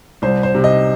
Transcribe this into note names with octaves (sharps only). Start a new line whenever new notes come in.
C2 C5
C5
C3
D#5